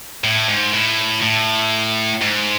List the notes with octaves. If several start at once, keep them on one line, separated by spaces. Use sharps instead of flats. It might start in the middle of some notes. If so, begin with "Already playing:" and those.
A2
G#2
A2
A2
G#2